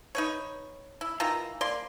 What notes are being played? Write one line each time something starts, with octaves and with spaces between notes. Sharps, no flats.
D#4 B4 C#5
E4
D#3 E3 F4 A#5
A#3 D5 C6